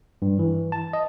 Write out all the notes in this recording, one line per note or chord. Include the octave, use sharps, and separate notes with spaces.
G2
E3
A5
D#5